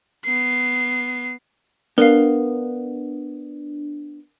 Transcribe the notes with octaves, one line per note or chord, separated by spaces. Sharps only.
B3 C7
B3 D4 A#4 F5